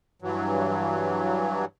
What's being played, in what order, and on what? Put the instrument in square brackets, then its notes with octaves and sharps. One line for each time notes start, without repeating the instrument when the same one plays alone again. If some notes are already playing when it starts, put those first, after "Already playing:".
[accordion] G2 E3 F#3